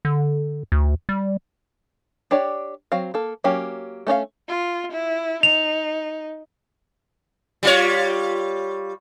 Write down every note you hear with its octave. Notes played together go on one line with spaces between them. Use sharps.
D3
D2
G3
D4 G4 C#5 D5
F#3 C4 F5
A#3 A4
F#3 A#3 C#4 G4
A3 C#4 D4 F5
F4
E4
D#4 F7
G3 F4 C#5